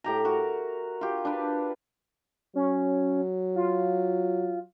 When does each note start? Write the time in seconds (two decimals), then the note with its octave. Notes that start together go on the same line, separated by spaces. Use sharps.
0.04 A2 G4 A#5
0.25 F#4 A#4
1.01 F4 G4
1.25 D4 B4
2.55 F#3 C#4
3.56 F4